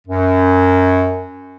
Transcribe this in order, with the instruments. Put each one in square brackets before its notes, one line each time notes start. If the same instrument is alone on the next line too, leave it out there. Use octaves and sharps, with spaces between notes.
[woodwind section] F#2